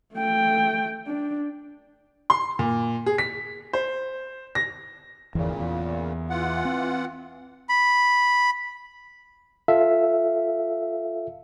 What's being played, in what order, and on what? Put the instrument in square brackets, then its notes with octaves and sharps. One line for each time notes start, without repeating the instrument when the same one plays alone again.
[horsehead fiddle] A3 G5
D4
[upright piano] C6
A#2
G#4
B6
C5
A#6
[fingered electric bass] G1 E2 E3 [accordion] A#2 C#3
[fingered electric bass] E2
[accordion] E3 F4 F#5
[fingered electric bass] C4
[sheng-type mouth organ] B5
[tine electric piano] F4 A4 E5 F5